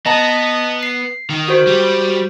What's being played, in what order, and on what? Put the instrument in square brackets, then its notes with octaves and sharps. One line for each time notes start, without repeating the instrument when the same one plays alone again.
[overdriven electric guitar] B3 [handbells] D#5 A5 A#5
[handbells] C7
[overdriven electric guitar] D#3
[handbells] F#4 C5
[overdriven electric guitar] G3